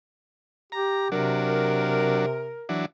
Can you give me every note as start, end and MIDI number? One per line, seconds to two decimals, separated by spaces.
0.72 1.11 67
0.72 1.08 82
1.12 2.59 48
1.12 2.26 54
1.12 2.26 62
1.12 2.69 70
2.69 2.86 52
2.69 2.86 54
2.69 2.86 62